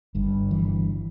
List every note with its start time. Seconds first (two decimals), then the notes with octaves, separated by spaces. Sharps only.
0.15 G1 G2
0.51 E3